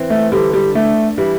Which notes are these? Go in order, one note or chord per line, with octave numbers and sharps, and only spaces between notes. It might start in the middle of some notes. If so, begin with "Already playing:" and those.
Already playing: E3 C4
A3
D3 G3
G3
A3 D4
E3 G3